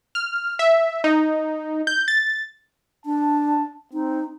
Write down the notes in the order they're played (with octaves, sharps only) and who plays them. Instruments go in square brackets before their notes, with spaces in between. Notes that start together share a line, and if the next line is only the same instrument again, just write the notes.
[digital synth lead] F6
E5
D#4
G6
A6
[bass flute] D4 [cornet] A5
[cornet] C4 [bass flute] D#4